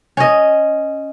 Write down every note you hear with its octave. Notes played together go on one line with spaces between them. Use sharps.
C#4 D#5